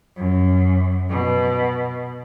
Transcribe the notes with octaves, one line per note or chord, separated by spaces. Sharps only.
F#2
B2